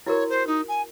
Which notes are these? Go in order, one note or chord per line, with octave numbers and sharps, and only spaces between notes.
E4 F#4 A#4 C#5
C5
D#4
G#5